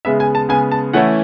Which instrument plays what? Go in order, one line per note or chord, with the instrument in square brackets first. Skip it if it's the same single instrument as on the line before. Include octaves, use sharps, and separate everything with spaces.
[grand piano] C#3 G#3 B3 E5
G#5
A5
C#3 G#3 B3 G#5
A5
E3 A3 C#4 E4 F#5